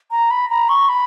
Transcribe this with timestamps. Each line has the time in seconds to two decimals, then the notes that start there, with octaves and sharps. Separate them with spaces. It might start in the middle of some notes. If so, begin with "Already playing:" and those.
0.11 A#5
0.31 B5
0.50 A#5
0.69 C#6
0.89 B5